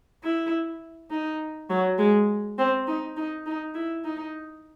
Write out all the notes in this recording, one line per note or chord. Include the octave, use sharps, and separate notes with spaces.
E4
D#4
F#3
G#3
C4
D#4
D#4
D#4
E4
D#4